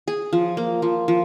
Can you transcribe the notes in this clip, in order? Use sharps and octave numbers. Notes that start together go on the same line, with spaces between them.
G#4
F3
A#3
F3
F3